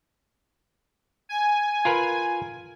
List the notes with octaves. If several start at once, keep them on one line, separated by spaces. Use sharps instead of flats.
G#5
F4 A#4 B4